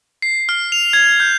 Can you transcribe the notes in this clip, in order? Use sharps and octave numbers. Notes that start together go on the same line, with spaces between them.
C7
F6
F7
G#6
G6